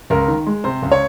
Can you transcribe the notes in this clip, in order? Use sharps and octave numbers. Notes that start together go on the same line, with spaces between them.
C#2 A#4
D#3
G#3
C3 C5
C#2
C#5